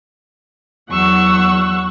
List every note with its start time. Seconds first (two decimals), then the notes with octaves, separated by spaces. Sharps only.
0.91 E2 F#3 F#5 C#6 E6